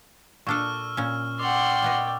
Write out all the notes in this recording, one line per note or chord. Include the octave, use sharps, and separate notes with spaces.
A#2 D4 A4 C#6 E6 F6
A#2 C#4
D5 F#5 G5 C6 D6
A#2 B3 D#5